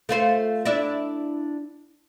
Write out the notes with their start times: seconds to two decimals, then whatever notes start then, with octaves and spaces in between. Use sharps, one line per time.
0.09 A3 F4 C5
0.65 D4 E4 E5